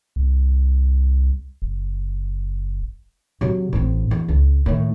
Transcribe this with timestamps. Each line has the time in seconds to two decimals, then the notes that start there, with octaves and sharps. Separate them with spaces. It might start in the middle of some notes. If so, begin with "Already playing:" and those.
0.16 C2
1.62 F#1
3.41 C3 F#3
3.73 A1 C4
4.11 E2
4.28 C#2
4.66 A2 D#3